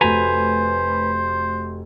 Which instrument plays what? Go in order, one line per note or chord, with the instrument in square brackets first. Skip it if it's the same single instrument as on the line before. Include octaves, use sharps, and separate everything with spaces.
[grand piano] F1 A3 F#4 [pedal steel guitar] B4 G#5 A#5 [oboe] C5